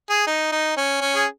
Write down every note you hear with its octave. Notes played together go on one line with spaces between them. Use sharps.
G#4
D#4
D#4
C#4
C#4
G#4